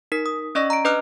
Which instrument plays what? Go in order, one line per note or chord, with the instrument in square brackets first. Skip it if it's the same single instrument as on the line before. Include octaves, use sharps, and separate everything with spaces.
[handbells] D#4 A#4 B6
D#6
C#4 D5 D#5 C#6 E6 A#6
A#5 D7
D4 B4 D#5 D6 F6 F#6